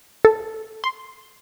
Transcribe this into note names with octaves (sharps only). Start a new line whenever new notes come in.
A4
C6